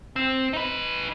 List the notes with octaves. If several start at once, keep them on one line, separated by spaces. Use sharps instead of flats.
C4
D#4 B4